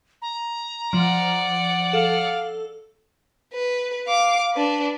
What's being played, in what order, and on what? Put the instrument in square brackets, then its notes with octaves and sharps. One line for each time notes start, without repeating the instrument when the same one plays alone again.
[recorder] A#5
[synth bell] F3 [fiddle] D5 F#5
[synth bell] A4 [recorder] F5
[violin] B4
F5 D6
D4 B4